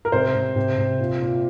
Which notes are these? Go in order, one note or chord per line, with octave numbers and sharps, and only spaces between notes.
A#4
C3 C5
C3
C3
C3
A#2
A#2